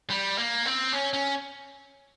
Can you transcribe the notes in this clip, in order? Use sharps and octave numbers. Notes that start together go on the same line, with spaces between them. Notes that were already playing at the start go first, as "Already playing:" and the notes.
G3
A#3
C4
C#4
C#4